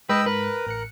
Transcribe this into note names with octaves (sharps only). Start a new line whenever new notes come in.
G#2 B4 D#5 G5 E6
A#4 B4
A1 F#6 C#7